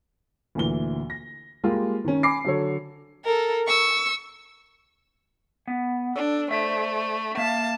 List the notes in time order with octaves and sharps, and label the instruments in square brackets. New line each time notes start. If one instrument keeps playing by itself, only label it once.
[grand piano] D2 A#2 E3 G7
A#6
G3 G#3 A#3 F4 G4
D#3 C#4
G#5 B5 D6 C7
D3 F#3 A4 C#5
[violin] A4 A#4
C#6 E6
[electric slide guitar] B3
[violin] D4 [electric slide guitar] A4
[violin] A3 [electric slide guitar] C5 D5 E5
[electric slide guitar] A#3 E5 F5 [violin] A5